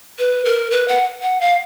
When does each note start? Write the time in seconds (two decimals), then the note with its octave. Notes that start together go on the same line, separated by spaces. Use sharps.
0.19 B4
0.45 A#4
0.71 B4
0.88 F#5
1.23 F#5
1.41 F5